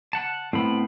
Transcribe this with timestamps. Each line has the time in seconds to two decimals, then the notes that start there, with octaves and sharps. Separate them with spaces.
0.13 F#5 A5
0.53 A2 B3 C4 B5